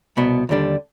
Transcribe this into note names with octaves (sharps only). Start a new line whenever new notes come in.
C2 B2 B3
D#2 D3 G3 D4